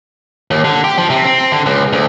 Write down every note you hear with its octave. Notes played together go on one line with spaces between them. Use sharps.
D#2
D3
G4
F3
C3
C4
D3
C#2
D2